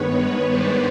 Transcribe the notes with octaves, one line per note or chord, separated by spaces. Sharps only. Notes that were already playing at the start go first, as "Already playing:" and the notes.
Already playing: G2 D#3 G#3 B3 B4 C#5
B4 C#5
C5 D5